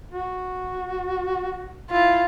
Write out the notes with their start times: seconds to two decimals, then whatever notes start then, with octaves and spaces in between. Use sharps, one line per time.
0.12 F#4
1.91 E4 F4